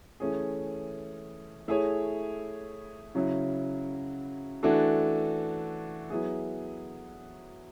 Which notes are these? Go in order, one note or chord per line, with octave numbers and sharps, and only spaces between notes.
E3 A3 C#4 G#4
A3 E4 G#4 C#5
C#3 F#3 C#4 E4
E3 A3 D4 F#4 A4
F#3 B3 E4 G#4